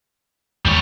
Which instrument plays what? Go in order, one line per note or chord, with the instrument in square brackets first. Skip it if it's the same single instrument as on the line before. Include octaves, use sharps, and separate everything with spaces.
[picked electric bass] D#2 G#2 E3 [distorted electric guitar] G3 C#5